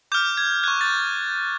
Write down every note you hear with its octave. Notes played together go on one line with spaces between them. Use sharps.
D6 F6 G6
G#6
C#6 F#6 G#6
A6